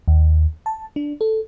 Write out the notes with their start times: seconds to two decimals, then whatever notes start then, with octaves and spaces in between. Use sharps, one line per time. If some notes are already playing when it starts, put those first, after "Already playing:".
0.08 D#2
0.66 A5
0.96 D4
1.21 A4